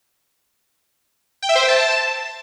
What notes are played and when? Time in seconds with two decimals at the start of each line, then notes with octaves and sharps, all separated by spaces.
1.42 G5
1.49 E5
1.55 C5
1.62 G5
1.68 A5